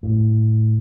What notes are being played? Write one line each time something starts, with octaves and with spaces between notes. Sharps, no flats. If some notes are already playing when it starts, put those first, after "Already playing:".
A2